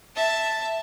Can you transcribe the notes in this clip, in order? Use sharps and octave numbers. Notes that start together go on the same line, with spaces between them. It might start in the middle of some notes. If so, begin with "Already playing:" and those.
E5 A5